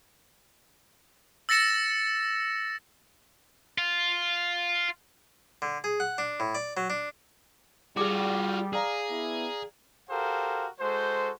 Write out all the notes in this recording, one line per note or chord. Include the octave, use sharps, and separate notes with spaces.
E6 A6 A#6 C#7 E7
F4
D3
G#4
F#5
D4
A2
D5
F#3
D4
G3 F4 F#4 G#4 D6
G#4 D5 F5 A#5
B3 E4
F#4 G4 A4 A#4 C5 F5
G#3 F#4 A4 C5